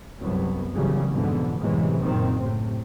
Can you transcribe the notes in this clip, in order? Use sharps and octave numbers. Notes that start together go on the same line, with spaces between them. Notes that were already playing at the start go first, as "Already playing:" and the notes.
C2 F#2 F#3 B3
G#1 D2 C#3 E3 F#3 G3
F2 G#2 B2 D3 E3 B3
F#2 A2 C3 E3 F#3 G#3
F#1 A#2 D#3 C4
A2 C3